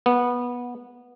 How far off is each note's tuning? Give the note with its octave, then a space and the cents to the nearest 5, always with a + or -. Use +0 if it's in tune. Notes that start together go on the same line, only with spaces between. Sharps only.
B3 -15